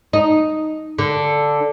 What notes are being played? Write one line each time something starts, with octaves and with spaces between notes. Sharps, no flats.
D#4
D3